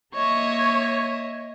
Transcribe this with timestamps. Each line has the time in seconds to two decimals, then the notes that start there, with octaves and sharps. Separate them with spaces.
0.14 A#3 C#5 D#5 E5 C#6